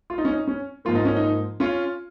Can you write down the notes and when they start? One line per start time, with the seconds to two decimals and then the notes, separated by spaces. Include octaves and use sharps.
0.10 F4
0.18 D#4
0.25 C#4
0.32 D#4
0.47 C#4
0.85 G#2 F3 A#3 F4
0.95 D#4
1.05 C#4
1.16 D#4
1.60 C#4 F4